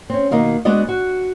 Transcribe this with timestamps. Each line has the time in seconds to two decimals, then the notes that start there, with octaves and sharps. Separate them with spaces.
0.10 C4 C#4
0.31 B2 D#3 A#3 D#5
0.65 G#3 B3 D4 F#4 D5 D#5
0.89 F#4